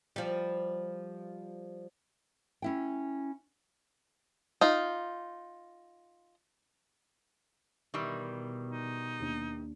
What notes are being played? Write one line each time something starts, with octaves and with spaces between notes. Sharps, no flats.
F3 G3
C#4 E4 G5
D#4 F4
B2 D#3 E3 G3
D#4
D#2 D4